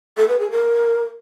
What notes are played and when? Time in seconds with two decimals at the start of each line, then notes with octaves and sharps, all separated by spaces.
0.17 A4
0.28 B4
0.40 G#4
0.51 A#4